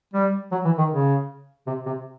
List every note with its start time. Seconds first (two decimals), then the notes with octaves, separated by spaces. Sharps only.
0.14 G3
0.52 F#3
0.65 E3
0.78 D#3
0.90 C#3
1.67 C3
1.86 C3